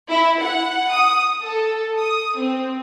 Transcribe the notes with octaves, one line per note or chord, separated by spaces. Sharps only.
E4
F#5
D#6
A4
D#6
C4